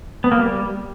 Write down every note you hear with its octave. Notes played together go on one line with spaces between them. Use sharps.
B3
A#3
G3